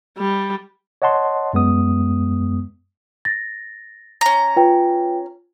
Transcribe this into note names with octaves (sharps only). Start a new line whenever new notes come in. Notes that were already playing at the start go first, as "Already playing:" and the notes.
G3
C#5 D#5 F#5 A5 C6
F#2 G#3 B3 D#6
A6 A#6
C#4 A#5
F4 B4 G5